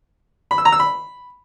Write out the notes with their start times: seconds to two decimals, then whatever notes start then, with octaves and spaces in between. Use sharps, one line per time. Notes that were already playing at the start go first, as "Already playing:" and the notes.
0.51 B5
0.58 E6
0.65 A#5
0.72 E6
0.80 B5